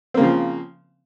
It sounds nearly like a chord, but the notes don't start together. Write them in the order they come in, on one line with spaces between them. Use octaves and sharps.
C4 A#3 C#3 F3